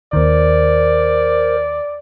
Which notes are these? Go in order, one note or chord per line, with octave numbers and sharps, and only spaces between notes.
D#2 D#3 A#4 C5 D5